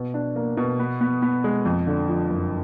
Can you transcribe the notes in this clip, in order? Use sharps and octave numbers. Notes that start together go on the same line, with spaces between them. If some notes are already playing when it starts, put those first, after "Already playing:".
Already playing: B2
D4
A#3
B2
B3
B3
B3
G#3
F2
D3
F3
F#1